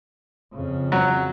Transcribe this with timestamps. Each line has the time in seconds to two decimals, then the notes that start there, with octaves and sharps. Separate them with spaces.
0.54 F2 C#3
0.92 F#3